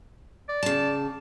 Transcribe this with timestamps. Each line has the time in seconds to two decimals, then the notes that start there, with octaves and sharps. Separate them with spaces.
0.49 D5
0.63 C#3 A5